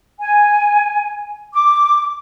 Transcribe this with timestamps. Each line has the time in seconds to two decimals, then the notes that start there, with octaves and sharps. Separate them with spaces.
0.20 G#5
1.53 D6